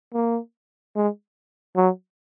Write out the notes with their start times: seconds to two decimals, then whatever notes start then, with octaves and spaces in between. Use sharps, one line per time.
0.14 A#3
0.95 G#3
1.76 F#3